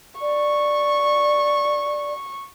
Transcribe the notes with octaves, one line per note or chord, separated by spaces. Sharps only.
D5 C#6